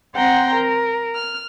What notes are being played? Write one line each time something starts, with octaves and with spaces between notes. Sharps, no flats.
C4 F#5 G5 A#5 C6
A#4
F6